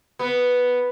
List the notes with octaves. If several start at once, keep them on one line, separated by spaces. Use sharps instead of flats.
B3